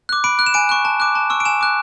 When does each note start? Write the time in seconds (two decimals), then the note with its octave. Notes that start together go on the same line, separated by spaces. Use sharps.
0.09 D6 F#6
0.24 B5 D7
0.39 F#6
0.46 E7
0.54 G#5 D7
0.69 C#6 F#6
0.85 A5
1.00 D6 F#6
1.15 A5
1.30 C#6 E6
1.40 D7
1.45 G#5 E7
1.61 D6 F#6